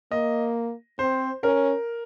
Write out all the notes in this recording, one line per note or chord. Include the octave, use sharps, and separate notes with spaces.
A#3 D#5
C4 C5
C#4 A#4